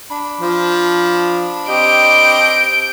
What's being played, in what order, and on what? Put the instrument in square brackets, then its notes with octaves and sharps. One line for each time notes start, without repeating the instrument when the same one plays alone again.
[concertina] D4 B5
[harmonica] F3
[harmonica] C4 G4 D#5 [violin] G6 D7